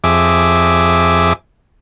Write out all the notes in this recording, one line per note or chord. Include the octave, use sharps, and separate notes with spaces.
F2 G#4 E5 D6